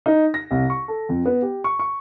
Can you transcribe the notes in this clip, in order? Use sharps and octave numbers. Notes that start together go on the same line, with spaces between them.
D#4
A#6
C2
C#6
A4
F2
B3
G4
C#6
C#6